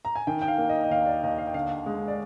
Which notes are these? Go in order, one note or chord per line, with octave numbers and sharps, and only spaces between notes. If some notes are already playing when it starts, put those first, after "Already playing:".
A#5
G#5
D#3 G5
G5
F5
A#3
D#5
D#5
D#2 F5
D5
D#2 D#5
F5
G5
D3 F5
G#3
D5